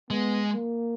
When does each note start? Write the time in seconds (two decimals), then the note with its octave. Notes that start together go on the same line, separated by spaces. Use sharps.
0.10 G#3 B3
0.53 A#3